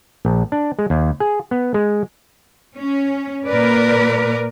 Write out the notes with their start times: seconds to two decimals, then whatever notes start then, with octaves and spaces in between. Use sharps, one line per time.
0.25 A#1
0.52 D4
0.79 G#3
0.90 D#2
1.20 G#4
1.51 B3
1.74 G#3
2.77 C#4
3.46 A#2 A#4 B4 D5